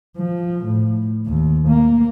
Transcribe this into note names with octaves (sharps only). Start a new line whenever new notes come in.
F3
A2
D#2
A#3